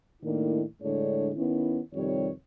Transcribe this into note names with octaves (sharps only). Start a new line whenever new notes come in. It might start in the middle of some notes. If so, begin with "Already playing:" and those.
A2 D#3 A#3 D4 E4
A2 D3 G#3 D4 G#4 C#5
D#3 B3 C#4 E4
F2 C3 D#3 G3 C#5